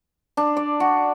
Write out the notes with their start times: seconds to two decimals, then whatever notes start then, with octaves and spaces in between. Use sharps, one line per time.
0.37 D4
0.57 D5
0.80 F#4